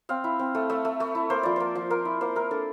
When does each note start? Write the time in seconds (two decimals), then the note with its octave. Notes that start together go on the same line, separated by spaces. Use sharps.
0.09 C4 F5
0.24 E4
0.39 C4
0.55 A3
0.70 A3 E5
0.85 A3
1.00 A3
1.15 E4
1.30 A#3 C5
1.43 F3 D5
1.56 A#3 C5
1.75 F3
1.90 A#3 A#4
2.05 E4
2.21 A#3 C5
2.35 E4 A#4
2.51 D4 A4